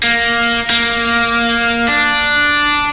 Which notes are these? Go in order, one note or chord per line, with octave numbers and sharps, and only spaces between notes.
A#3
A#3
D4